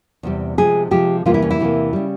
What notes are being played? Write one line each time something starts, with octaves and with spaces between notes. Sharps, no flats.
E2 C3 G3
C3 F3 G#3 G#4
C3 F3 G#3 G4
E2 C3 E3 G3 A#3 F4
E4
C#4
E4
E2 C3 E3 G3 A#3
C#3 G3